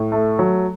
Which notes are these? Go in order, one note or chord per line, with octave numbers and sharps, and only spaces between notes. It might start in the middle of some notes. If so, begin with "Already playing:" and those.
Already playing: A2
A3
F#3